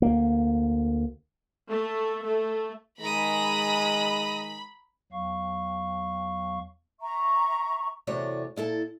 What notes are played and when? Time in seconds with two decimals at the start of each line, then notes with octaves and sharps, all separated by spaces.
0.02 D2 A#3
1.70 A3
2.26 A3
3.01 D#3 G#3 A#5 B5 D#6
5.12 E2 F#3 F5 C#6
7.01 E5 A#5 C#6
8.07 E2 C3 A3 F#4 C#5 D5
8.56 A#2 E4 A4 A5